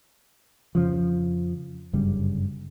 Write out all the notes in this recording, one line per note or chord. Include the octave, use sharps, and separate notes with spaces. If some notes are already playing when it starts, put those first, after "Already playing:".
F2 C#3 F3
G1 F#2 C#3 G3